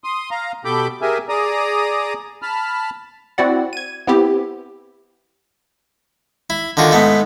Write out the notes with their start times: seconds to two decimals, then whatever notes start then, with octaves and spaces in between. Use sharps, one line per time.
0.04 C6 D#6
0.31 F5 A#5
0.65 B2 G4 A4 B5 D6 G6
1.02 G4 G#4 A#4 E5 G#5
1.29 G#4 D5 A#5 D#6
2.42 A5 B5 F6
3.38 C4 E4 F#4 D5 F#5
3.73 G#6 D#7
4.07 B3 C4 E4 G4
6.50 E4
6.77 D3 D#3 F4 F#4
6.92 G#2 A3 B3